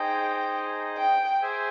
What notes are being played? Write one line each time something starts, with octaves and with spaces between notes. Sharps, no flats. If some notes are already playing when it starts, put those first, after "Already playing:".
Already playing: D#4 G#4 C5 D#5 G5
G5
G#4 C5 E5 G#5